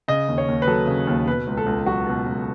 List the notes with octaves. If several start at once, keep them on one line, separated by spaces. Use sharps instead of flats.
C#3 D#5
D#2
C#5
D#2
B4
F#3 A4
C#3
D#2
B2 B4
C#2
A4
C#2
F#3 F#4
B2
C#2